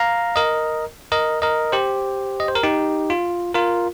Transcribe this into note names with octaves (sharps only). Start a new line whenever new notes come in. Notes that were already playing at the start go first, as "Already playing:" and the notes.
Already playing: F5 A#5
A#4 D#5
A#4 D#5
A#4 D#5
G4 C5
D#5
C5
A#4
D#4 G4
F4
F4 A#4